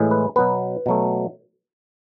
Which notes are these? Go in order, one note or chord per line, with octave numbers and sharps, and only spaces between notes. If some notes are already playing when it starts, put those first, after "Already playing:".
Already playing: A2 E3 G#3
B4
B2 F#3 B3 B4
B2 F#3 A3